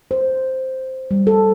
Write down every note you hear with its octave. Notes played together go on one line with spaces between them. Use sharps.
C5
G3
A4